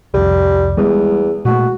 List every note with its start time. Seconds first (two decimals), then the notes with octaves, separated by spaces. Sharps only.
0.14 C2 F2 G3
0.77 E2 G3 G#3 B3
1.45 A#2 G#3 A3 F#4